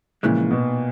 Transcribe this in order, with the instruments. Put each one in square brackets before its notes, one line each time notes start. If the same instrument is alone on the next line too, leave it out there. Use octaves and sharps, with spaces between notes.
[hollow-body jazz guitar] F2 C#3 E3 G#3 [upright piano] A#2
[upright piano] B2